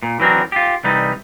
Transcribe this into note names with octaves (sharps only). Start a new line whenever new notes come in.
A#2
E3 F#3 C4 D4 A#4
F4 G4
C2 E3 G3 D#4